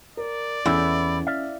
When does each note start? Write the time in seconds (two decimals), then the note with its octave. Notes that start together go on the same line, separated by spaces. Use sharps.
0.17 A#4 D5
0.66 E2 C#4 E4 A4
1.27 D5 E5 F5